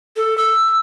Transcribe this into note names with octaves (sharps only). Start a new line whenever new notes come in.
A4
E6